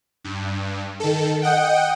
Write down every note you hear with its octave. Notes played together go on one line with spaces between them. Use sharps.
G2
D#3 A4
D#5 F#5 G5